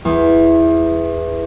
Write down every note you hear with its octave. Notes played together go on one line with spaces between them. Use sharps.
E2